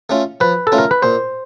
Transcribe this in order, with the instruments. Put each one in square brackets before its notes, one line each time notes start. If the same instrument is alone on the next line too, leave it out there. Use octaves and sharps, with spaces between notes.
[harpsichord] A3 C#4 F4
[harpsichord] F3 [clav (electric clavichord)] B4
[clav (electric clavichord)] A4
[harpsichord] A3 C#4 F4
[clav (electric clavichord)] A#4
B4
[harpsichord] A#2 [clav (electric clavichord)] C5